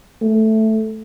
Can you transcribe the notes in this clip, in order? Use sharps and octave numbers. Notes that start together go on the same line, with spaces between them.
A3